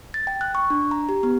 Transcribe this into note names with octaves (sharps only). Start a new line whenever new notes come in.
A6
G5
F#6
C#6
D4
A#5
G4
B3